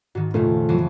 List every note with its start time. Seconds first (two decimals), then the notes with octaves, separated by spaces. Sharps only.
0.15 G#2 D#3 F#4
0.34 F2 A#2 C#3 A3 F4
0.69 F2 E3 F#3